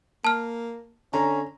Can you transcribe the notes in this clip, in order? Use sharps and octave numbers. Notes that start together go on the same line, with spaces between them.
A#3 A5 F6
D3 C#4 A#5